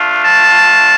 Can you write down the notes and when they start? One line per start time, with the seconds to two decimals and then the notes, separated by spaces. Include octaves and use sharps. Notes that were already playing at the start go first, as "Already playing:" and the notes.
Already playing: A3 D4 F4
0.23 A5